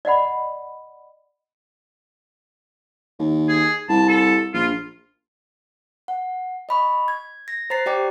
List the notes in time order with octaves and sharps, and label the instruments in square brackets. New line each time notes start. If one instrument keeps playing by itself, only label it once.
[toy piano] D5 D#5 F#5 B5
[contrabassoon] D#2
[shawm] G#4
[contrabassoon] C2 [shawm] A5
[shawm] A4
[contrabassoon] A#1 [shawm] F4
[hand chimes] F#5
D#5 B5 C#6
G#6
A#6
C5 A#5 A6 C7
G4 D5 G5 D6